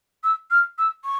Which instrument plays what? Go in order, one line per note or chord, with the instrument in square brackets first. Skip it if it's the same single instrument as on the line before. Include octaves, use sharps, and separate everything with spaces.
[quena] E6
F6
E6
C#6